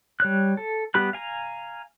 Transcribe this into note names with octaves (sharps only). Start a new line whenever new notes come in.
G3 C#5 F#6
A4
G3 B3 G4 B5 F#6
F5 G#5 A#5